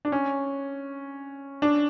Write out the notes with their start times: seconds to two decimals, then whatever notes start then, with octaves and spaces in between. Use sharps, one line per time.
0.05 D4
0.12 C#4
1.62 D4